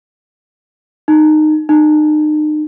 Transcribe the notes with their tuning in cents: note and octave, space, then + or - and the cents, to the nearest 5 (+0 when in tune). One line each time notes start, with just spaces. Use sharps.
D#4 -15
D#4 -35